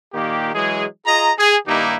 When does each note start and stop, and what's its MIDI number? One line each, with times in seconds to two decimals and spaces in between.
0.13 0.51 46
0.13 0.51 51
0.13 0.51 58
0.13 0.51 67
0.54 0.85 52
0.54 0.85 54
0.54 0.85 56
0.54 0.85 68
1.06 1.31 65
1.06 1.31 68
1.06 1.31 75
1.06 1.31 82
1.38 1.57 68
1.67 1.95 43
1.67 1.95 51
1.67 1.95 58
1.67 1.95 63
1.67 1.95 64
1.67 1.95 67